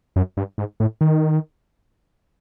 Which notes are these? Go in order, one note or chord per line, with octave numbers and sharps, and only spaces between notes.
F#2
G2
G#2
A2
D#3